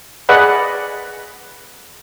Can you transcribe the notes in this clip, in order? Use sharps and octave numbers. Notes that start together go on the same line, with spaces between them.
G#4 B4 D5 D#5 F#5 B5